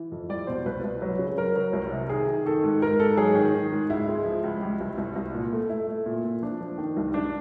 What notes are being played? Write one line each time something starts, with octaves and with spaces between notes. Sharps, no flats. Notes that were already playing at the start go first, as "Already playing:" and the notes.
Already playing: E3
F2
G3 D5
B2 C5
C2 B4
C2
F#3
C#3
F#3 A#4
F#3
C2
C3
D#3 G#4
D#3
D#3 A4
G#2
G#2 A#4
G#2 A4
F#3 G#4
D#3
D#3
G#2
C#2 E4
G#3
F3
C#2
G3
C2
C2
C2
A#2
A3
A3 E4
A3
A#2
A#2
F3 D4
F3
D#3
C2
C2 D4